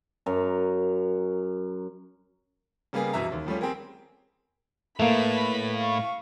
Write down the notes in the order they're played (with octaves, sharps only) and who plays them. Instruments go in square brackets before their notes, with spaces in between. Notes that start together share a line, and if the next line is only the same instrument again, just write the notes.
[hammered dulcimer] F#2 A#5
[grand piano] C#3 G3 A#3 B3 G#4
F1 F#2 B2 E3 E5 A#5
D#2
F3 G3 A3 C#4
C4 G4 G#4 A#4
[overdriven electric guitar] A2 [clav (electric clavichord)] A3 A#3 [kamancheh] B4 B5
[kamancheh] F5 C#6